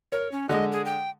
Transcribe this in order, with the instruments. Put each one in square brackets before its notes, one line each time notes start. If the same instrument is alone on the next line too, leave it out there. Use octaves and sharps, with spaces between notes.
[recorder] A#4 [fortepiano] C#5
[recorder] C#4
[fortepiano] D3 G#3 [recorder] D#5
[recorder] G#4
G5